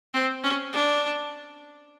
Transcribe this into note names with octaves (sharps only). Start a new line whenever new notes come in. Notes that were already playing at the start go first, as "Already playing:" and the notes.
C4
C#4
D4